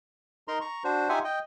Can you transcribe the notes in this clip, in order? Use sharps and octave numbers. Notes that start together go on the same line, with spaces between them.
D#4 A#4 A#5 C6
A#5 C#6
D4 F#4 C5
D#4 F4 G4 E5 F#5 G#5
D#5 G5